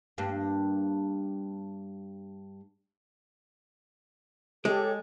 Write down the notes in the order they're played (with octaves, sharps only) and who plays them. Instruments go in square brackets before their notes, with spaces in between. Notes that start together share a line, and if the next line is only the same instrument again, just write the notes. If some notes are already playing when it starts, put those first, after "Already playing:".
[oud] G2 A#3
[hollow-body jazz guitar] G#3 [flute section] G4 A4 C#5